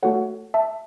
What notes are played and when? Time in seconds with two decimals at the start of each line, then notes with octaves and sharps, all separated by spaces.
0.03 A3 F#4 A4 C#5 F#5
0.54 E5 A5